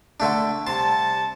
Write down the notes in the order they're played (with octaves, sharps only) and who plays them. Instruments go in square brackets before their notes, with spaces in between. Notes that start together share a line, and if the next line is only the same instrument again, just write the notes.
[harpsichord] D3 A3 D4
[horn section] C3 G3 A5 [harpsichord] C6